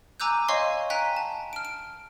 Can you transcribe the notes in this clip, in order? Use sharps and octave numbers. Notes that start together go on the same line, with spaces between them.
G#5 A#5 D6 E6 F#6 G6
C#5 D#5 F5 G#5 C6 C#6
G5 G#5 A#5 F#6 B6
A5
F6 D7
D7